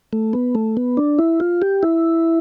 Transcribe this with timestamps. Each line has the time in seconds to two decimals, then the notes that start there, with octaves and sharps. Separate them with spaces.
0.13 A3
0.33 B3
0.55 A3
0.77 B3
0.97 D4
1.19 E4
1.40 F4
1.62 G4
1.83 E4